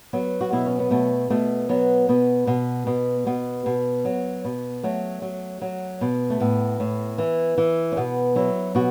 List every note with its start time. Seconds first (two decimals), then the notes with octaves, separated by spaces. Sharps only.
0.13 F#3 B3
0.41 F#4
0.52 B2 E4
0.66 C#4
0.79 B3
0.91 B2 A3
1.30 B2 A3
1.69 F#3 B3
2.09 B2 B3
2.47 B2
2.87 B2
3.26 B2 B3
3.66 B2
4.05 F#3
4.45 B2
4.83 F#3 A3
5.22 F#3
5.62 F#3
6.01 B2
6.30 A3
6.40 A2 B3
6.80 A2
7.18 E3
7.58 E3
7.92 C#4
7.97 B2 B3
8.36 F#3 E4
8.75 B2 F#4